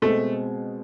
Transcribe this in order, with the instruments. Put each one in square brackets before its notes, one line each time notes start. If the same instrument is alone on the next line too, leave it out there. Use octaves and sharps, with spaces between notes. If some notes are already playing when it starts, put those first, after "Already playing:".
[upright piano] B2 G#3 C4 [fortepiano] A3